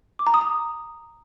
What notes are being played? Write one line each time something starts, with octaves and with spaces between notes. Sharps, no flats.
D6
A#5
D#6
A#5